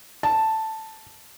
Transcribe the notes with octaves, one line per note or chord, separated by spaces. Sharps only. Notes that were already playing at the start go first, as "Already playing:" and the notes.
A5